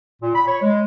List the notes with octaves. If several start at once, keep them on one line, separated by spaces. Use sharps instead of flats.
A#2
B5
C#5
G#3